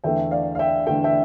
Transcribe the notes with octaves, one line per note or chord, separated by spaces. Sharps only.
E2 D3 A3 E5 G5
D5 F5
F5
E5 G5
E2 D3 A3 G5
E5 G5